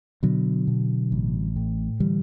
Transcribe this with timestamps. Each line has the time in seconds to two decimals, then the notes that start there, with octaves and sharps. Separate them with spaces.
0.23 B2 D3 F#3
0.67 B2
1.12 A1
1.56 A2
2.00 D3 E3 G3